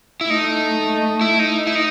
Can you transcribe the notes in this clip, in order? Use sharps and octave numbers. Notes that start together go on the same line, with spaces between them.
E4
A3 D#4
E4
D#4
E4
D#4